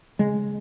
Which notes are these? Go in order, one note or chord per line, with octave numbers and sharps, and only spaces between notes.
C#3 G#3